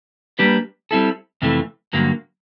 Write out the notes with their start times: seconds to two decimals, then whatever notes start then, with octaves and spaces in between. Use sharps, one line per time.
0.39 G3 A#3 D4 G4 B4
0.91 G3 C4 E4 A4
1.42 F2 C3 E3 A3
1.93 G2 D3 F#3 A#3